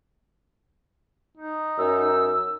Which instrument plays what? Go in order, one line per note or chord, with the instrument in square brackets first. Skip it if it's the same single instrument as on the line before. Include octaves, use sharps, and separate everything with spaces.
[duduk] D#4
[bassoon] F#2 [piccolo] E6